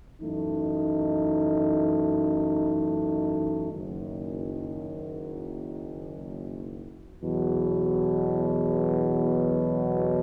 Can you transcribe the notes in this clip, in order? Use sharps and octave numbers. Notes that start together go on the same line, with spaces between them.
F#2 E3 A3 D#4
F#1 F#2 D#3
E2 B2 F#3